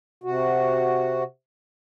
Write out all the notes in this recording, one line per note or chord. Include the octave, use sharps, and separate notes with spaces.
C3 F#4